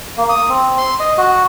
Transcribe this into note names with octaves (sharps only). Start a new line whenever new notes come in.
A#3
D#6
C4
C6
D#5
F#4